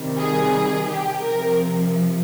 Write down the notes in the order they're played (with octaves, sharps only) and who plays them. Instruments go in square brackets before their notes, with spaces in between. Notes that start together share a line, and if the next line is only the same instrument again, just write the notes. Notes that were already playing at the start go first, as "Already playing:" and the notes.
Already playing: [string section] C3 D#3 G3
G#4
G4
C3 F3 A#4